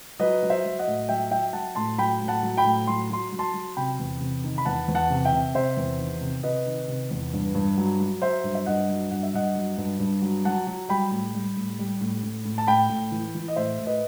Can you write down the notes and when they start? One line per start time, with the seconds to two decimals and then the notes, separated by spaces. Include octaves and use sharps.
0.19 F#3 B4 D#5
0.43 F#3
0.49 C5 E5
0.65 F#3
0.79 D#5 F#5
0.87 A2
1.09 F#3 E5 G5
1.31 F#3 E5 G5
1.53 F#3 F#5 A5
1.75 A2 A5 C6
1.98 F#3 G5 B5
2.21 A2
2.28 F#5 A5
2.43 F#3
2.57 G5 B5
2.65 A2
2.87 F#3 C6
3.10 F#3 C6
3.33 F#3
3.39 A5 C6
3.54 F#3
3.77 C3 G5 B5
3.99 E2
4.20 C3
4.44 D#3
4.58 B5
4.65 E2 F#5 A5
4.88 E2
4.95 F#5 A5
5.10 C3
5.25 E5 G5
5.33 C3
5.54 C3 C5 E5
5.77 E2
5.99 D#3
6.21 C3
6.43 C3 B4 D#5
6.66 D#3
6.88 C3
7.11 E2
7.33 G2
7.55 G2
7.77 F#3
8.00 F#3
8.22 F#3 C5 E5
8.44 G2
8.55 E5
8.66 G2 D#5 F#5
8.89 F#3
9.11 G2 F#5
9.23 E5
9.34 G2 D#5 F#5
9.55 F#3
9.78 G2
10.00 G2
10.22 F#3
10.45 F#3 F#5 A5
10.67 F#3
10.89 G3 G5 B5
11.11 A2
11.34 G3
11.56 A2
11.79 G3
12.01 A2
12.23 A2
12.45 A2
12.58 A5
12.67 A2 G5 B5
12.89 A2
13.12 E3
13.35 E3
13.48 D#5
13.56 A2 C5 E5
13.79 A2
13.86 B4 D#5